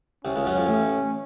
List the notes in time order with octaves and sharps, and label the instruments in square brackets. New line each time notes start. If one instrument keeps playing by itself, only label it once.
[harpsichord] C2 C3 [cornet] C#4
[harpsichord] C#2 C#3
F#2 F#3
F2 F3
A1 A2